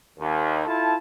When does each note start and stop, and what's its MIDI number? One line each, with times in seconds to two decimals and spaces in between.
0.19 0.61 39
0.66 0.94 64
0.66 0.94 65
0.66 0.94 69
0.66 0.94 81